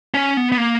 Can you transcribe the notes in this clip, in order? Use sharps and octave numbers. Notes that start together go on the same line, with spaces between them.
C#4
B3
B3
A#3